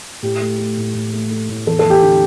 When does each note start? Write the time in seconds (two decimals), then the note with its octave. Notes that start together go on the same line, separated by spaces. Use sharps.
0.22 A2 G4
0.41 A3
0.58 A3
0.77 A2
0.94 A2
1.13 A3
1.31 A3
1.49 A2
1.67 E2 A4
1.79 A4
1.84 E2
1.90 G4
2.02 D3